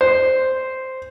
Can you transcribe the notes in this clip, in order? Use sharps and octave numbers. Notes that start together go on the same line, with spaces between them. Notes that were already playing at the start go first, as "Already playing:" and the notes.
C5